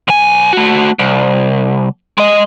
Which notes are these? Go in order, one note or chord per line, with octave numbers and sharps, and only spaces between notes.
B1 G#5
A3 F#4
C2
G#3 D#5